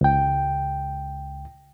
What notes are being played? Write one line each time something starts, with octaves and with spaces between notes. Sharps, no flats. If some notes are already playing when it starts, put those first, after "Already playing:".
C#2 G5